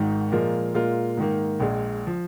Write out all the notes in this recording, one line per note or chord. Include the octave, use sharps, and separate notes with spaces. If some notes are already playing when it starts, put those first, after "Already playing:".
Already playing: G#1 G#2 D#3
A#2 F3 G#3 F4 A#4
A#2 G#3 F4 A#4
G#2 D#3 A#3
A#1 A#2 G#3
F3